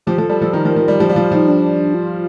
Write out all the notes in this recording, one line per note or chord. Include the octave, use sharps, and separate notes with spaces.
F3 G4
F3 A4
G3 A4
F3 A4
D#3 A#4
F3
F3
G3
F3 G4
G3
F4
F3
F4
F3 D#4
D4
F4